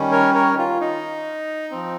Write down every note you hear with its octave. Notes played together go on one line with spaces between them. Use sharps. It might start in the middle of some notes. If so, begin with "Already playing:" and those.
Already playing: D#3 G3 C#4
A#4 C#5
A#4 C#5
F4
D#4
F3 C4